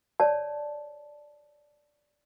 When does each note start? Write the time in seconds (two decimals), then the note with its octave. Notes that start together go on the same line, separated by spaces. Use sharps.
0.20 C#5 D5 A5